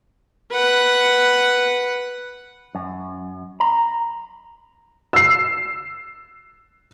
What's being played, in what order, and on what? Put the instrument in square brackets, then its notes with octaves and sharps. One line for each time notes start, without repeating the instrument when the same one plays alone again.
[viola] B4 F#5
[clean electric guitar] F#2
A#5
[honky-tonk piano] E6 C7